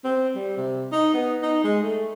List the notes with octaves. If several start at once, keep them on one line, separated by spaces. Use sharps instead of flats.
C4
G3
C3
D#4
B3
D#4
G#3
A3